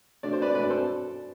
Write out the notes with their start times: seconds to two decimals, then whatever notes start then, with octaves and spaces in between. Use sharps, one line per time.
0.23 B2 A3 D4 D5
0.33 C5
0.42 B4 D5
0.55 B2 A3 D4 B4 D5
0.70 A4 C5